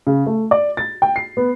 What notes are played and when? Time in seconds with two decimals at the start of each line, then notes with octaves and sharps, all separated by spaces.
0.07 C#3
0.27 A3
0.51 D5
0.77 A6
1.02 G5
1.16 C7
1.37 B3